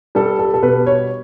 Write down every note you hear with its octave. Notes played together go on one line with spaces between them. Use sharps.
G3 A4
A4
A4
B2 B4
C#5